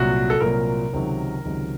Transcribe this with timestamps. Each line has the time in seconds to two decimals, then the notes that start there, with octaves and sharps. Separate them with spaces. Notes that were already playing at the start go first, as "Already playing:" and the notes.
Already playing: C2 A#2 F#3 F#4
0.30 A4
0.40 C2 A#2 F#3 A#4
0.93 C#2 C3 D#3 F#3
1.45 C#2 C3 D#3 F#3